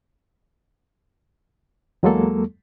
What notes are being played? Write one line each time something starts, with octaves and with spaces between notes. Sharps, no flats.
E2 F#3 G#3 A#3 A4